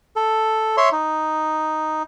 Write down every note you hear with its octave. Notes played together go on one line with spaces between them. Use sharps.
A4
C#5 E5 C6
D#4